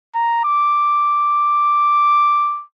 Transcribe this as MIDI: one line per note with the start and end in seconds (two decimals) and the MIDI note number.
0.15 0.44 82
0.45 2.64 86